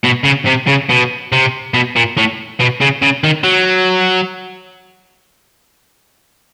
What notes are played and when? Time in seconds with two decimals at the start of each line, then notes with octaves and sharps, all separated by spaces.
0.04 B2
0.25 C#3
0.47 C3
0.68 C#3
0.90 B2
1.32 C3
1.74 B2
1.96 A#2
2.17 A2
2.60 B2
2.81 C#3
3.02 C#3
3.24 D#3
3.44 F#3